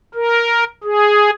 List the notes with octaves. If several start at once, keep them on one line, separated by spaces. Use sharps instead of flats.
A#4
G#4